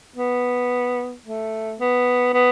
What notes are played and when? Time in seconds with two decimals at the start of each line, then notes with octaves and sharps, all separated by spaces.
0.16 B3
1.25 A3
1.80 B3
2.34 B3